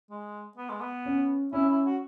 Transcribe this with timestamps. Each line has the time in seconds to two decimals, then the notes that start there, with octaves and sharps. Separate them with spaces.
0.10 G#3
0.57 B3
0.69 G#3
0.81 B3
1.05 C#4
1.53 C#4 E4
1.69 E4
1.85 F#4